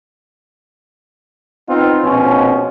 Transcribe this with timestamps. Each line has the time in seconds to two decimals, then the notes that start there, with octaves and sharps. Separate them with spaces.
1.69 B3 C4 D#4 F4
2.03 A#1 B2 F3 C4 C#4